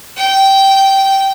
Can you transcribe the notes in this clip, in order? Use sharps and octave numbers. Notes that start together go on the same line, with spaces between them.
G5